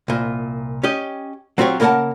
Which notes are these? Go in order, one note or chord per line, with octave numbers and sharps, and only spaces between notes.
C2 A#2
C#4 G4 D#5
F#3 C4 F4 G4 C#5
C#3 A#3 A#4 D5 F#5 A5